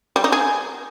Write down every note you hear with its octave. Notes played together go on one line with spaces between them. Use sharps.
G3
D#4
G#4